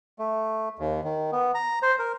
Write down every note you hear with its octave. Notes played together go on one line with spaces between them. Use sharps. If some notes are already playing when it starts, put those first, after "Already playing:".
A3
D#2
D#3
B3
A#5
C5
A#4